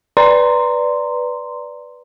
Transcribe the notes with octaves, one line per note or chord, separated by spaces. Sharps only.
B4 D5 A#5 C6